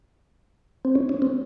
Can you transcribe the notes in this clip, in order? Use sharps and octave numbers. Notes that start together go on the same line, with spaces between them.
C4
C#4
C#4
C4